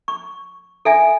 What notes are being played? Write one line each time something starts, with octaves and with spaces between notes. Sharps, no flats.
C#6
A4 E5 G#5